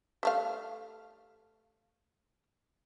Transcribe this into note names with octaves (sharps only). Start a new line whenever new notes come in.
G3 A3 F5